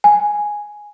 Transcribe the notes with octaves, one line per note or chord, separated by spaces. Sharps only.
G#5